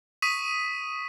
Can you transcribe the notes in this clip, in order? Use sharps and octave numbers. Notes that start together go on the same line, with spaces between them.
C#6 D#6 B6 D#7